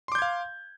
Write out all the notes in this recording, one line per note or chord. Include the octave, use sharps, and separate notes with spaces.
F5 C6 D6 G6 G#6